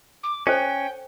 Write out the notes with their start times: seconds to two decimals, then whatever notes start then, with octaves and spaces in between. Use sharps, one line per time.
0.23 D6
0.47 C#4 A4 C5 G5